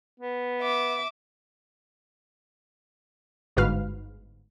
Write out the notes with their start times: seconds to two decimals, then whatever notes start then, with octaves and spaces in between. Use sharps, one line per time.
0.20 B3
0.62 E5 D6
3.57 G1 G#2 F#4 B4 F5 F6